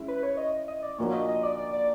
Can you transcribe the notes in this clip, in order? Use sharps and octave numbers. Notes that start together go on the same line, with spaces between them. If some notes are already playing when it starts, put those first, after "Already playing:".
Already playing: G#3 C#4 E4
B4
C#5
D#5
D#5
D5
A#2 F3 A#3 D4 F#4 C#5
D#5
D#5
D5
D5
D5